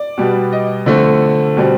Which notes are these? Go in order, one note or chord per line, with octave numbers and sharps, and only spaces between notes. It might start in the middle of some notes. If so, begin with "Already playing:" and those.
Already playing: D5
B2 G3 B3
D#5
D3 F3 A3 C4
B2 G3 C4